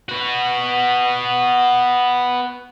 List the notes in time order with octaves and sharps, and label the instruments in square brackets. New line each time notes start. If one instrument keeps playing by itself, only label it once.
[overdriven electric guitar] B3 F#4